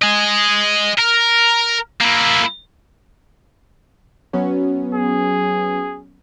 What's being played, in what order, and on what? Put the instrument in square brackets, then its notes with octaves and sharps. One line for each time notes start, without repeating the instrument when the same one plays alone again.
[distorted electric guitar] D#5 G#5
A#4
A#3 E4
[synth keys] F#3 B3 C#4
[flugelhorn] G#4